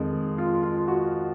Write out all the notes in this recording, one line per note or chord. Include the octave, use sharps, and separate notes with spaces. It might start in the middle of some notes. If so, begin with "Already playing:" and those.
Already playing: F2 D#3 G#3
F4
F4
F#4